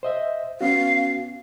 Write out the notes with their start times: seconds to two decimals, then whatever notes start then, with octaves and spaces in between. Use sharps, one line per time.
0.03 C5 D#5 E5
0.61 B3 C#4 F#4 F5